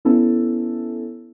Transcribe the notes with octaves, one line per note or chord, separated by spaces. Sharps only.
B3 C#4 E4 A4